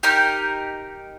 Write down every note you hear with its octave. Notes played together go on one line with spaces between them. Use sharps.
D#4 G4 A#4